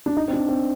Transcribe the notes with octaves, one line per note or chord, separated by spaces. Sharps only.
D4
D#4
C4
D4
C4